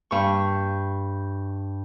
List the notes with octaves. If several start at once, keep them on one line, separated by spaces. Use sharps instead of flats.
G2 C#6